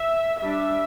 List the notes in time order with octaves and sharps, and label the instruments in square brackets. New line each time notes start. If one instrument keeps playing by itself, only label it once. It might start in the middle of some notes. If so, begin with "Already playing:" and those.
Already playing: [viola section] E5
G3 D4 E5